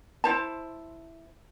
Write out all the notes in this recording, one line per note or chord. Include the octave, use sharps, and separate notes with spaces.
E4 C5 A5